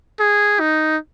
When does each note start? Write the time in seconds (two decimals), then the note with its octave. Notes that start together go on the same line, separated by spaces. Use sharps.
0.19 G#4
0.60 D#4